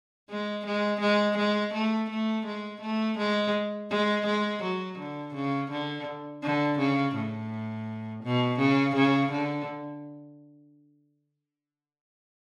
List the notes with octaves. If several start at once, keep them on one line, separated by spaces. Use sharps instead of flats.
G#3
G#3
G#3
G#3
A3
A3
G#3
A3
G#3
G#3
G#3
F#3
D3
C#3
D3
D3
C#3
A2
B2
C#3
C#3
D3